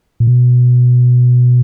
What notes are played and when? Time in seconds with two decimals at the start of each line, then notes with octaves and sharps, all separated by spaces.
0.20 A#2
0.27 B2